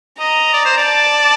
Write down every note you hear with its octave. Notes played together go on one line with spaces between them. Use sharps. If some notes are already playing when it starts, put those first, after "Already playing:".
D#5 A#5
D5
C5
D5
A5